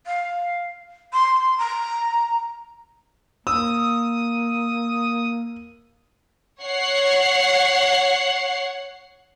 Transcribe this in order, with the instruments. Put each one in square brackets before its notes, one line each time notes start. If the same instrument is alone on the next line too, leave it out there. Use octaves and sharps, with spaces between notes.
[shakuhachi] F5
C6
A#5
[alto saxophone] A#3 [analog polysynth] D#6 [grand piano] E6
[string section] C#5 F#5 C7